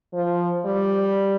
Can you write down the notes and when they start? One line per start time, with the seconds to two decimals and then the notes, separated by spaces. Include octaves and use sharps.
0.13 F3
0.66 G3